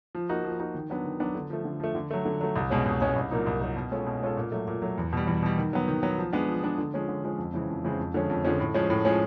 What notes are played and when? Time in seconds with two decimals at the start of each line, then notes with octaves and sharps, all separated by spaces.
0.15 F3
0.29 A#3 D#4 F#4
0.44 F3
0.59 A#3 D#4 F#4
0.74 D#3
0.90 F#3 B3 D4
1.04 D#3
1.20 F#3 B3 D4
1.35 D3
1.50 F3 A3
1.65 D3
1.80 F3 A3
1.95 D3
2.11 F#3 A3
2.25 D3
2.41 F#3 A3
2.56 C2
2.70 B2 G#3 C#4
2.86 C2
3.01 B2 G#3 C#4
3.16 C2
3.31 A#2 F#3 A#3 D#4
3.46 C2
3.61 A#2 F#3 A#3 D#4
3.76 B2
3.91 G#3 C#4 F4 A4
4.06 B2
4.22 G#3 C#4 F4 A4
4.37 A#2
4.52 F#3 A3
4.68 A#2
4.82 F#3 A3
4.98 E2
5.13 B2 G3
5.27 E2
5.43 B2 G3
5.58 D#3
5.73 F#3 B3
5.88 D#3
6.03 F#3 B3
6.18 F3
6.33 G#3 B3 D4
6.48 F3
6.63 G#3 B3 D4
6.78 D3
6.94 F3 G#3 C#4
7.08 D3
7.24 F3 G#3 C#4
7.38 F2
7.54 C#3 E3 G#3 C4
7.69 F2
7.85 C#3 E3 G#3 C4
7.99 F2
8.14 D3 F3 G#3 C#4
8.30 F2
8.45 D3 F3 G#3 C#4
8.60 A2
8.74 F3 G#3 C#4
8.90 A2
9.05 F3 G#3 C#4